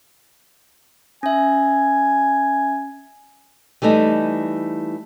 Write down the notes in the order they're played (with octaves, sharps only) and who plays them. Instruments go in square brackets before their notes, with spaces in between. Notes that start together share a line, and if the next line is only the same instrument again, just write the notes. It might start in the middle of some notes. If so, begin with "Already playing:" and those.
[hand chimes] C#4 E5 [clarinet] G#5
[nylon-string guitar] E3 G3 A3 D#4